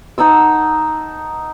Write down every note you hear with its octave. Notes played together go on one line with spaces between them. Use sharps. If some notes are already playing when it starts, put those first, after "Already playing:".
D#4 F#5 A5 E6